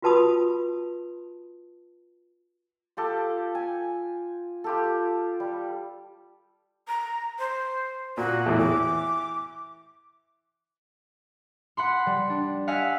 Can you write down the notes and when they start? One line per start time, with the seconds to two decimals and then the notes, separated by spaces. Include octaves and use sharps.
0.02 F4 F#4 B4 A5 B5 D#6
2.97 F4 G4 A4
3.55 G#5
4.64 F4 G4 A4
5.40 G3
6.88 A#5
7.39 C5
8.17 A#2 F#4
8.46 E2 A2 E3
8.58 E3 D6
11.77 F#5 B5 C6
12.06 G3
12.30 D4
12.67 D#5 F5 F#5 G#5 E6 B6